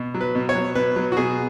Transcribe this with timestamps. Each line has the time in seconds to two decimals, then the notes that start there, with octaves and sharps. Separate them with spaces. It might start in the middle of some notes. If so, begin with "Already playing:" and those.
Already playing: B2
0.14 F#3
0.21 B4
0.35 B2
0.49 C#5
0.55 F#3
0.75 B2 B4
0.96 F#3
1.12 F#4
1.17 B2 G#4